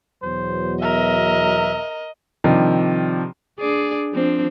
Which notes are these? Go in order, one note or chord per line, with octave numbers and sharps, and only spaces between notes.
E2 B2 F#3 C5
A#4 D#5 E5
C3 D#3 F3 G3 D4
D4 G#4 D5
F3 C4 D4